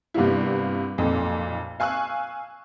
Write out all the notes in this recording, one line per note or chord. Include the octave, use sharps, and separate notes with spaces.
G2 C3 A#3 B3 E4
B1 F2 A#2
F5 G#5 C#6 E6 F#6